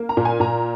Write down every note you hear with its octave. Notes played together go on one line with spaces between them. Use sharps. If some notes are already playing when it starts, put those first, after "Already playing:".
Already playing: A#3
A#5
A#2
G#5
A#2 A#5